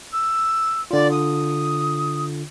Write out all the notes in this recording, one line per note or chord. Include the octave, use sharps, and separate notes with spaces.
E6
D3 F4 D5
D#6